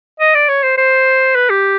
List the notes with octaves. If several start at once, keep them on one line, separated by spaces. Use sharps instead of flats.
D#5
D5
C#5
C5
C5
B4
G4